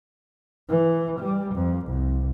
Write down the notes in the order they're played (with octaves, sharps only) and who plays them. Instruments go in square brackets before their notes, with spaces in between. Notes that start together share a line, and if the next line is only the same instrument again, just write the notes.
[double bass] E3
G3
F2
C2